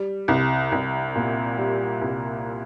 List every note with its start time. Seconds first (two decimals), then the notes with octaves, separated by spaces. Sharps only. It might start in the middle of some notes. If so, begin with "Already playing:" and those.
Already playing: G3
0.28 C2
0.72 C2
1.15 A#2
1.58 G3
2.02 C2